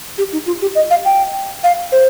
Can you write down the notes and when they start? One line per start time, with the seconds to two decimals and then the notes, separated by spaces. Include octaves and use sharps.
0.18 G4
0.33 D#4
0.46 F4
0.62 G4
0.75 D#5
0.90 F5
1.05 G5
1.64 F5
1.92 C5